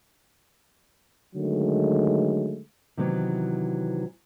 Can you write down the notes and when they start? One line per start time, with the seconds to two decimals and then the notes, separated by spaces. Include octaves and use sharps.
1.35 D3 D#3 F#3 G#3 A3
2.97 C3 D#3 E3 F#3 B3